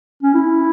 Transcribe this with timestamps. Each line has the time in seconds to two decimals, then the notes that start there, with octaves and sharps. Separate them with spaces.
0.23 C#4
0.34 E4